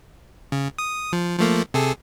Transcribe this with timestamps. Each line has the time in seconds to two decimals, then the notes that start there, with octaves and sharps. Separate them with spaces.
0.52 C#3
0.79 D#6
1.13 F3
1.39 F3 A3 A#3
1.74 C3 G#4 A4